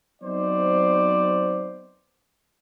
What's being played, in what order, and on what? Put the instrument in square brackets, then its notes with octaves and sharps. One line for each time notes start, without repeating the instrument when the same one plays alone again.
[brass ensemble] F#3 B3 C4 D#4 C5 D5